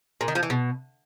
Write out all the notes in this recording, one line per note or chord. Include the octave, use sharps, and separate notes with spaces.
A#2
D#3
F3
E3
B2